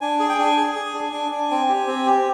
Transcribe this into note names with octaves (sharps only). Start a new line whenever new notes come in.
D4 G#5
G#4
G5
D4 G#5
G#4
G#4
D4
D4
D4
C4
G4
C4
G4